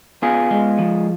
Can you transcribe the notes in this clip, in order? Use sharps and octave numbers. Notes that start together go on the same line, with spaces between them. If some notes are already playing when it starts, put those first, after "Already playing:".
B3 F4 G#4
G#3
F3